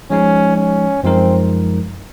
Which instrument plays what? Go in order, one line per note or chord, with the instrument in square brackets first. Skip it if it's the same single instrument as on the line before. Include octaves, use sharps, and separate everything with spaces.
[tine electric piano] F3 G#3 D#4 [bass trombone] C#4
[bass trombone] C#4
[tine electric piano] F#2 F3 G#3 D#4 A#4 [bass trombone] C4